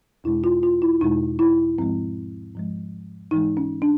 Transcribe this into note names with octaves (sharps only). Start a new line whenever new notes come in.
E2 B2 G#3 E4
F4
F4
E4
E2 B2 G#3 D#4
E4
G#2 F3 G#3 C4
G#2 F3 G#3
G#2 E3 G#3 D#4
C#4
D4